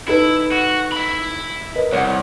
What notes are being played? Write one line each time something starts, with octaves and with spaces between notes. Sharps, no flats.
D#4 E4 A4 B4
F#4
E5 B5
A#4 B4 D#5
C2 C#5 F#5